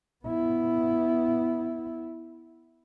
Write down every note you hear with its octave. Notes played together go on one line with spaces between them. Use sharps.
B3 E4